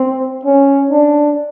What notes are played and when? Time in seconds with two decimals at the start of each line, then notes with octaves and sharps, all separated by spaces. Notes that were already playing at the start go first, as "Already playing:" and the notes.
Already playing: C4
0.45 C#4
0.91 D4